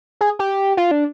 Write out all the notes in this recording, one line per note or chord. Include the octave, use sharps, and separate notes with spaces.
G#4
G4
F4
D4